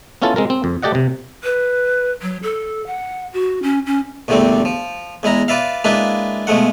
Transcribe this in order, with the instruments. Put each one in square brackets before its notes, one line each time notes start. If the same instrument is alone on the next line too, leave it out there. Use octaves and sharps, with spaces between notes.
[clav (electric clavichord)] B3 C#4 E4 F4 A4
G#3 C4 A#4
C4
F2
A3 G4 D5 D#5 F#5
C3
[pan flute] B4
F#3
A4
F#5
F#4
C#4
C#4
[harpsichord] A#1 E2 D3 G3 A3 C4
F3
E2 G#3 E4 A#5
F4 B4 D5 E5 F5
G#3 A#3 D4 E4 F4 B4
B2 F3 G#3 A3 F#5